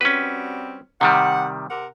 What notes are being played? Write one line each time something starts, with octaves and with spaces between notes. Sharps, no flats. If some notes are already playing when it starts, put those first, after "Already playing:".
G3 C4 C#4 F#4 B4
C3 D#3 G3 F#5
C3 A#4 F#5